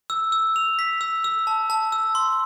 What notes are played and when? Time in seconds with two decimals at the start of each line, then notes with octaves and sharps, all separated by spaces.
0.10 E6
0.32 E6
0.56 F7
0.79 B6
1.01 E6
1.24 E6
1.47 A5
1.70 A5
1.92 E6
2.15 C6